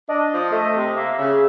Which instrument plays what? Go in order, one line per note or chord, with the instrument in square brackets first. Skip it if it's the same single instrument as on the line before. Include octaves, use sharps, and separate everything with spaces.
[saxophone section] D4 [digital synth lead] D#5
[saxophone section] F3
[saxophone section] A3 [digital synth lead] D#5
[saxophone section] C3
[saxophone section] A#3 [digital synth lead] E5
[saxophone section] C#3